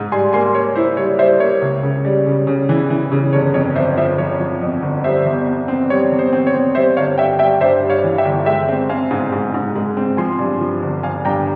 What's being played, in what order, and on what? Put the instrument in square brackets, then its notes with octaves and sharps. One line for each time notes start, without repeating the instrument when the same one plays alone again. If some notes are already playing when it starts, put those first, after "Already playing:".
Already playing: [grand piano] G#2
[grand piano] G3 [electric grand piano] G#5 C6
[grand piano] A#3 [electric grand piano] G#5 C6
[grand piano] A#3 [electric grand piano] C#5
[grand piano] E4 [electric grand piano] C5
[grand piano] G3 [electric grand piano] C#5
[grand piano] G3 [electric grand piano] C5 E5
[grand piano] A#3 [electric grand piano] C#5
[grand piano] C#2
C#3
G3
C#3
C#3
E3
E3
C#3
[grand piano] G1 [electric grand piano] C#5
[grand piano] F2 [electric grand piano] C#5
[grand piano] G1 [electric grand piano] C5 E5
[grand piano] F3 [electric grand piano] C5 E5
[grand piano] F3 [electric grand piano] C#5
[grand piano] F3
F2
G1
[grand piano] G3 [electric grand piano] C5 E5
[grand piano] E2
E2
C4
[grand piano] G3 [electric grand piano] C#5
[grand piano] E2
[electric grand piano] C5
[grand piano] C4
[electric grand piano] C#5
[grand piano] C4
[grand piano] G3 [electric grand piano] C5 E5
[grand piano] G1 [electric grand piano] C#5 F5
[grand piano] G3 [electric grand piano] E5 G5
[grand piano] G3 [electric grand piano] E5 G5
[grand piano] G2 [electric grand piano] C5 E5
[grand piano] G3
[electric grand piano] C#5 F5
[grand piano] E3
[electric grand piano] E5 G5
[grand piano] G1
[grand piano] G#3 [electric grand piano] E5 G5
[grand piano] C4
[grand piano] C4 [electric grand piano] F5 G#5
[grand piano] G#2
G#2
G#2
G#3
C4
[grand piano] F3 [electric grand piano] G#5 C6
[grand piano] G2
F3
G1
[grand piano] G1 [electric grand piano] F5 G#5
[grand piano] G2 [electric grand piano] G5 A#5